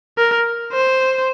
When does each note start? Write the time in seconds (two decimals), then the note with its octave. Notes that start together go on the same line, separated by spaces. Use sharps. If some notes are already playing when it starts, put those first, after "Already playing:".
0.18 A#4
0.73 C5